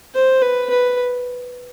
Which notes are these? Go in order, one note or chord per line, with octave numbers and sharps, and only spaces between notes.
C5
B4
B4